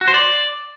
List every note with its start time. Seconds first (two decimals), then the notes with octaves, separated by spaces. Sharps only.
0.01 F#4
0.08 C5
0.14 D5